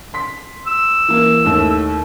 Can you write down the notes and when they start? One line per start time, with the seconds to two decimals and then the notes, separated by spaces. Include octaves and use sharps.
0.14 C6 B6
0.67 E6
1.08 E3 A#3
1.44 D#2 A2